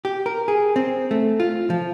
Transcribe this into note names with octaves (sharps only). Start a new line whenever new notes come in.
G4
A#4
G#4
C4
A3
F4
F3